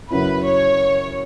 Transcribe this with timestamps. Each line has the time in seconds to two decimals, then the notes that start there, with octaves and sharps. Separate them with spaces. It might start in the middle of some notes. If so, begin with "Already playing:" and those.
0.11 F#2 C#3 F#3 C#4 E4 B4
0.46 C#5